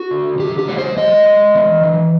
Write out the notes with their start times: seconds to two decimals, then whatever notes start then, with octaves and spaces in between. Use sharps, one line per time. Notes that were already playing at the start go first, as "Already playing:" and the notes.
Already playing: F#4
0.11 D3
0.39 D3 G4
0.59 G4
0.68 G#3 C#5
0.78 C5
0.96 G#3 D#5
1.26 G#3
1.55 E3
1.83 E3